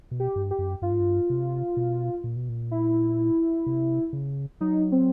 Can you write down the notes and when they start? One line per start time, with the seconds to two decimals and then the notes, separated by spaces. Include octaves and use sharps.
0.11 B2
0.20 G4
0.36 G2
0.51 G4
0.59 F#2
0.82 G2 F4
0.91 G#2
1.00 G2
1.30 C3
1.77 B2
2.24 A#2
2.36 B2
2.49 A#2
2.71 E4
3.66 C3
4.13 C#3
4.61 F#3 D#4
4.92 C4